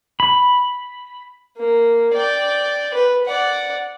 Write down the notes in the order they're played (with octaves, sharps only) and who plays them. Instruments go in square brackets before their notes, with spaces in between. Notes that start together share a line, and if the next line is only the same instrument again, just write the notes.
[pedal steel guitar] B5
[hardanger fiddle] A#3
D5 G5
B4
D5 F#5